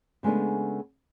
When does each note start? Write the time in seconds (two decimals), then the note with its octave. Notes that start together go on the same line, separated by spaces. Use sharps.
0.23 C#3 G#3 A3 B3 D4